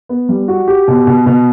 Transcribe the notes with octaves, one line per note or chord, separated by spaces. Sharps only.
B3
G3
F#4
G4
B2
B2
B2